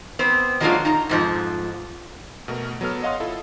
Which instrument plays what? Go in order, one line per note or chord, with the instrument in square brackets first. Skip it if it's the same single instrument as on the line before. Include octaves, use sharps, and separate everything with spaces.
[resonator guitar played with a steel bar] B3 C4 C5
D#3 F#3 G#3 A#3 D4 F4
D#4 A#5
F2 G#2 F3
[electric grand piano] B2 A3 A#4
F#3 B3 A4 F6
C#5 D#5 F5 F#5 C6 D#6
E4 F4 A4